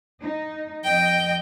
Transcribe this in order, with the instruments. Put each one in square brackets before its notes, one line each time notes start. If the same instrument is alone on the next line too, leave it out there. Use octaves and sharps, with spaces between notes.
[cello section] D#4
[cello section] F2 D#5 [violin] G5